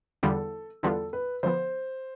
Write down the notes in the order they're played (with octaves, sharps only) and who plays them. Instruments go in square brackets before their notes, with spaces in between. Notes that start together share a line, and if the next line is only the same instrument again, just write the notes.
[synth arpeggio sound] E2 D3 G3 B3 F4 [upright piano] A4
[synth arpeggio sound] E2 D3 G3 B3 F4 [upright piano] A4
[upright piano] B4
[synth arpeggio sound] D3 F3 B3 [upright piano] C5